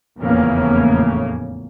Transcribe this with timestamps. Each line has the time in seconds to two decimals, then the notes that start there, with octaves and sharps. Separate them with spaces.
0.19 F1 E2 A2 C#3 A#3 C#4